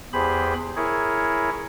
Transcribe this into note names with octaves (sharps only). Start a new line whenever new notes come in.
E2 G4 G#4 C5 B5
E4 G#4 A#4 C#5